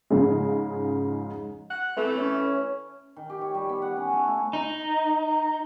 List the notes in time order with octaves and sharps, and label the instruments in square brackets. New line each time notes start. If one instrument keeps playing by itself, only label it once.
[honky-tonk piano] G#2 C#3 F3 G#3
[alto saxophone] F#5
[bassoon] E3 [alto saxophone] A3 [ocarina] C4
[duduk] C#4 [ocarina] C#5
[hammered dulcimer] D#3
G4
C#5
G3
B3
F#5
C#4
A3
E4
[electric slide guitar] D#4